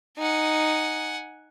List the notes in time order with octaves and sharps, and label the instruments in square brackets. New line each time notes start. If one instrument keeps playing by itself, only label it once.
[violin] D#4 [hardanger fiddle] F#5 G#5